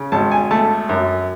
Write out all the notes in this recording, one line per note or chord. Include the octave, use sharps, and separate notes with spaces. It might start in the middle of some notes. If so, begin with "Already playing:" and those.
Already playing: C#3
G#1 A5
G#5
A3 A5
F#2